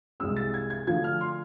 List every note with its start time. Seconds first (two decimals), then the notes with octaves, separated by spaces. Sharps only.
0.20 C2 C3 G#3 C4 E6
0.37 A6
0.54 G#6
0.70 G#6
0.87 D3 F3 A3 G#6
1.04 F6
1.21 C6